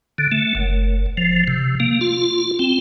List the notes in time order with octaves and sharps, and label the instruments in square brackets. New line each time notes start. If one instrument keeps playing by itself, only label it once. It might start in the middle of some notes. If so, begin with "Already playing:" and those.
[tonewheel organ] D3
A3
F#1
F3
C3
A#3
F4
C4